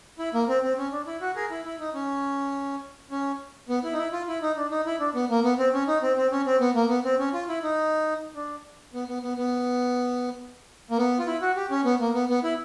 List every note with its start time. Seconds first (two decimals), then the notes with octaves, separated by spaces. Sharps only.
0.19 E4
0.34 A#3
0.48 C4
0.63 C4
0.78 C#4
0.92 D4
1.07 E4
1.21 F#4
1.35 G#4 A#4
1.51 E4
1.65 E4
1.80 D#4
1.94 C#4
3.11 C#4
3.69 B3
3.84 E4
3.93 D#4
3.98 E4
4.12 F4
4.28 E4
4.42 D#4
4.57 D4
4.71 D#4
4.86 E4
5.00 D4
5.15 B3
5.30 A#3
5.44 B3
5.59 C4
5.73 C#4
5.88 D#4
6.02 C4
6.17 C4
6.32 C#4
6.46 C4
6.60 B3
6.75 A#3
6.89 B3
7.05 C4
7.19 C#4
7.34 F4
7.49 E4
7.63 D#4
8.35 D4
8.94 B3
9.08 B3
9.23 B3
9.37 B3
10.90 A#3
10.98 B3
11.19 F4
11.27 E4
11.42 F#4
11.56 G4
11.71 C#4
11.85 B3
12.00 A#3
12.15 B3
12.29 B3
12.43 E4